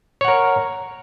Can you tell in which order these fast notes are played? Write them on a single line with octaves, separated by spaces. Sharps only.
C#5 F#5 A#4